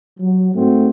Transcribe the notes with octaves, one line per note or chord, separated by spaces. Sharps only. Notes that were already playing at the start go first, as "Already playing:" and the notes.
F#3
G#2 A3 C4 F#4